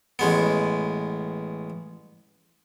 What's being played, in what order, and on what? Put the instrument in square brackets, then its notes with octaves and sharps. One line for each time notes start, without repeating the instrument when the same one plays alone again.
[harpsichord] A1 G#3 B3